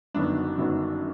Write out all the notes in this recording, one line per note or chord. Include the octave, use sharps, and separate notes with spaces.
G1 F#2 D#3 F#3 B3 D4
G1 F#2 D#3 F#3 B3